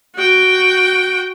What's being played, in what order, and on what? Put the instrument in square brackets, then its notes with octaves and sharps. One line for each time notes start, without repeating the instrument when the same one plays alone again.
[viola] F#4 G5